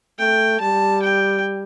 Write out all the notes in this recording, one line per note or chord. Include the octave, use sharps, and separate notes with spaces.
A3 G5
G3 A5
G5